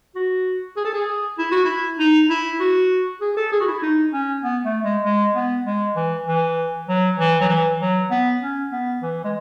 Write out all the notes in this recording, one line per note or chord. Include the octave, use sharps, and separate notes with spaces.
F#4
G#4
A4
G#4
E4
F#4
E4
D#4
E4
F#4
G#4
A4
G#4
F#4
E4
D#4
C#4
B3
A3
G#3
G#3
B3
G#3
E3
E3
F#3
E3
F#3
E3
F#3
B3
C#4
B3
E3
G#3